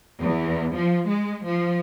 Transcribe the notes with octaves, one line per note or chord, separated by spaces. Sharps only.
E2
F3
G#3
F3